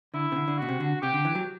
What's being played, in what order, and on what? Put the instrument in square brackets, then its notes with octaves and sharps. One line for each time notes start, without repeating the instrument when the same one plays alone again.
[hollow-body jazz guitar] D3 [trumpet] E4
[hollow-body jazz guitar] C3
D3
D3
[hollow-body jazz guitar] B2 [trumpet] F#4
[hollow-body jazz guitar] C3
D3
[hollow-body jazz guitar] C3 [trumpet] G4
[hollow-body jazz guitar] D3
E3
F#3